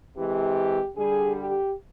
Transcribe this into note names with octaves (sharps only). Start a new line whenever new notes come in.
C3 E3 G#3 G4
D3 G3 G#4
G4